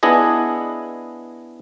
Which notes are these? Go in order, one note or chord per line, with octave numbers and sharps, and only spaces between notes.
B3 D4 E4 G#4 D#5